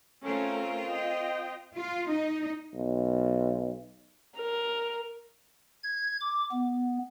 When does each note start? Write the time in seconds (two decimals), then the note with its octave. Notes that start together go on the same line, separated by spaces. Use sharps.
0.23 A3 C4 C#4 F4 A#4
0.88 D#5 G5
1.76 F4
2.09 D#4
2.74 B1
4.37 A#4
5.84 G#6
6.20 D6
6.51 B3